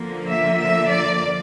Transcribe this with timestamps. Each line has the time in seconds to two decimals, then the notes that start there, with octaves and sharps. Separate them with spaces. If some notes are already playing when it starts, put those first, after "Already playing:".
Already playing: D3 F3 A#3
0.29 E5
0.59 E5
0.89 D5